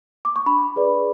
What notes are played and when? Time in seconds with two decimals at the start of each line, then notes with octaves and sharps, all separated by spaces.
0.25 D6
0.36 C#6
0.46 D4 B5
0.76 G#4 B4 D5